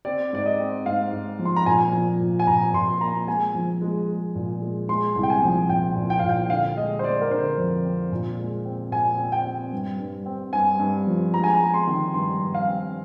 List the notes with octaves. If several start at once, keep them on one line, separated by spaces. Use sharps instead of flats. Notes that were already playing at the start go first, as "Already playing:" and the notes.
C4 D5
G#2 D5
D#5
C4
G#2 F5
G#2
F3
C6
A#5
A#2 G#5
F3
A#2
G#5
A#2 A#5
A#2 C6
A#3 A#5
G#3 G#5
F3
G#3
G#3
A#2
G#3
G#3 C6
C2
G5
G#5
F3
A#2 G5
A#2
G5
A#2 F5
G5
D3 F5
G#3 D#5
C5
G#3 D5
A#4
D3 C5
F2
C4
A#2
G#3
C4
A#2 G#5
C4
G5
C4
G2
G2
C4
G2 G#5
G2
F3
G#3 A#5
G#5
A#5
G#3
C6
D#3
G2 C6
G2
F5
C4